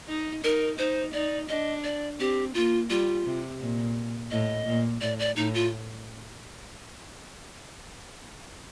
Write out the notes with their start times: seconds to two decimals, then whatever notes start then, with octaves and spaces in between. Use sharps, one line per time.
0.08 D#4
0.43 D#4 A#4
0.78 D#4 C5
1.13 D#4 D5
1.49 D4 D#5
1.84 D5
2.19 C4 G4
2.54 A#3 F4
2.90 G3 F4
3.26 C3
3.60 A#2
4.31 A2 D#5
4.66 A#2
5.01 A2 D5
5.19 D5
5.36 A2 D#4
5.54 F4